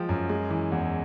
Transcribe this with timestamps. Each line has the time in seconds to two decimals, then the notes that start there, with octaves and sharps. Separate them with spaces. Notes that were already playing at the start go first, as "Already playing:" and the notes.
Already playing: F3 G#3 G5
0.09 F#2
0.29 G#3
0.50 E3
0.72 E2